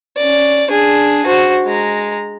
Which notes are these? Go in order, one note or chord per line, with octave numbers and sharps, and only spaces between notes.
C#4 D5
D4 G#4
F#4 C5
G#3 A#5